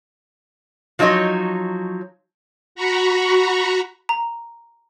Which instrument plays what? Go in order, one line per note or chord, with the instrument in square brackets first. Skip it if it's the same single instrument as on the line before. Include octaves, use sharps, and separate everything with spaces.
[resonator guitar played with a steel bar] F3 F#3 D#4 C#5 D#5
[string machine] F#4 A#5 B5 C#6
[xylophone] A#5